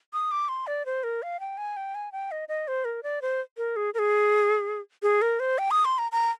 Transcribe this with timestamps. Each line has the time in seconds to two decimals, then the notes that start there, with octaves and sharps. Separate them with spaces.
0.13 D#6
0.31 D6
0.49 C6
0.67 D5
0.86 C5
1.04 A#4
1.22 F5
1.40 G5
1.58 G#5
1.77 G5
1.95 G#5
2.12 G5
2.31 D#5
2.49 D#5
2.68 C5
2.85 A#4
3.03 D5
3.22 C5
3.57 A#4
3.76 G#4
3.94 A#4
3.99 G#4
5.03 G#4
5.22 A#4
5.40 C5
5.58 G5
5.71 D#6
5.85 C6
5.98 A#5
6.12 A#5